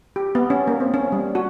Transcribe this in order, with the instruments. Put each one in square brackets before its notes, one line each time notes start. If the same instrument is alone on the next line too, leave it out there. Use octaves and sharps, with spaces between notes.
[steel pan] G4
B3
C#4
A#3
C4
C#4
G3
F#4